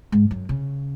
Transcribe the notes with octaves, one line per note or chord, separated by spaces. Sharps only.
G#2
F#2
C#3